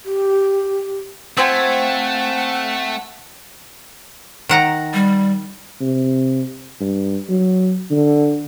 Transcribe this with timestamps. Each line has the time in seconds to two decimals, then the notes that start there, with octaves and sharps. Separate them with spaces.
0.05 G4
1.37 A3 C4 F4 F#5 G#5
4.49 D#3 F#5 A#5
4.94 G3
5.81 C3
6.80 G2
7.29 F#3
7.91 D3